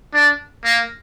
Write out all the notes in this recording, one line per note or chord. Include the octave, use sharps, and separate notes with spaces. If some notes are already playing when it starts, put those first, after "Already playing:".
D4
A#3